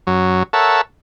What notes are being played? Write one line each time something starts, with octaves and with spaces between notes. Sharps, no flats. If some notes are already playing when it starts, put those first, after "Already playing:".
F#2 F#3
A4 A#4 C#5 E5 F#5 A5